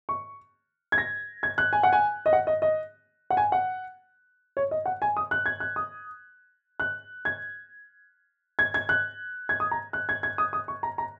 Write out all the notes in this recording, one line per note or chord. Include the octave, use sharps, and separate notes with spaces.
C#6
G#6
A#6
G#6
F#6
G#5
F#5
G#5
D#5
F#5
D#5
D#5
F#5
G#5
F#5
C#5
D#5
F#5
G#5
D#6
F#6
G#6
F#6
D#6
F#6
G#6
G#6
G#6
F#6
G#6
D#6
A#5
F#6
G#6
G#6
D#6
D#6
C#6
A#5
A#5